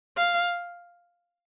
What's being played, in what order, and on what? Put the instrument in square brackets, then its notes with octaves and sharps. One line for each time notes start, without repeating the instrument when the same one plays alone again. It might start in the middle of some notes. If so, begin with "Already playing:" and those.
[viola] F5